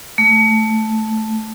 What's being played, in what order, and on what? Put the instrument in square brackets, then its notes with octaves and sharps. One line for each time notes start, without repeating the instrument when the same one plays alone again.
[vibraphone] A3